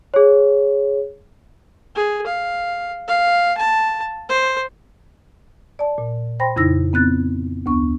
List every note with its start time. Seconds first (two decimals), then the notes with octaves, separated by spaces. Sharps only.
0.14 G#4 C#5
1.95 G#4
2.26 F5
3.08 F5
3.57 A5
4.29 C5
5.79 D5 A5
5.98 A#2
6.40 C5 G5 B5 C6 A#6
6.56 F2 C#3 D#4 E4 E6 A#6
6.93 B3 C4 F#6 A6
7.66 D2 B3 C#6